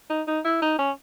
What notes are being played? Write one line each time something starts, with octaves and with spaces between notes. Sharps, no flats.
D#4
D#4
E4
D#4
C#4